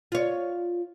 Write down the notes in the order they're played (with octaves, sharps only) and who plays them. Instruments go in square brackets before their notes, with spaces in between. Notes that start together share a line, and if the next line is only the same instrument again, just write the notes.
[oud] F4 C#5